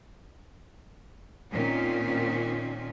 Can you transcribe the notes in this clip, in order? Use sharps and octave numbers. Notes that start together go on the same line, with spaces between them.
A#2 D#3 C4 C#4